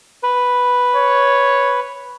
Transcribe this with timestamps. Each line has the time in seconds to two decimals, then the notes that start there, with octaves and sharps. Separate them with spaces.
0.23 B4
0.96 C#5